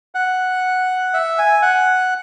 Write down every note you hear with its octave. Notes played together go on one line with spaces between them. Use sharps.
F#5
E5
G#5
F#5